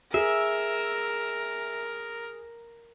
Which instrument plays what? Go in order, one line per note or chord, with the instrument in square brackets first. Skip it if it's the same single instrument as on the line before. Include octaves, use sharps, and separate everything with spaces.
[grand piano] G#4 [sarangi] A#4 [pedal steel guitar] E5